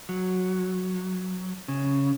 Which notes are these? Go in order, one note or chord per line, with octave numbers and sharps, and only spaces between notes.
F#3
C#3